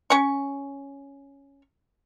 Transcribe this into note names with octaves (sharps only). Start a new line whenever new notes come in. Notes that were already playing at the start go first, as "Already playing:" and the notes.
C#4 C#6